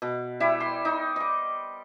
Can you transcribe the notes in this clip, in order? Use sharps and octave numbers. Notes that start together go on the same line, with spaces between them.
B2
G3 E4 E5
C6
D#4
D#5 D6